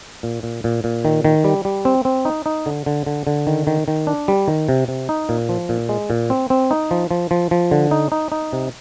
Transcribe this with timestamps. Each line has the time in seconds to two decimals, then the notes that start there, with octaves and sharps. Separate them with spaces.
0.23 A#2
0.43 A#2
0.64 A#2
0.84 A#2
1.05 D#3
1.25 D#3
1.44 G3
1.65 G3
1.85 C4
2.05 C4
2.25 D#4
2.46 D#4
2.66 D3
2.86 D3
3.06 D3
3.27 D3
3.47 D#3
3.67 D#3
3.88 D#3
4.07 D4
4.28 G3
4.48 D#3
4.69 C3
4.88 C3
5.09 D#4
5.29 A#2
5.49 F3
5.69 A#2
5.89 G#3
6.10 A#2
6.30 C4
6.50 C4
6.71 D#4
6.91 F3
7.11 F3
7.31 F3
7.51 F3
7.71 D3
7.91 D#4
8.12 D#4
8.32 D#4
8.53 C3